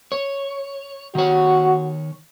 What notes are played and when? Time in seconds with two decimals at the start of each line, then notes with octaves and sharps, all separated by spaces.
0.12 C#5
1.15 D#3 F#4 C#5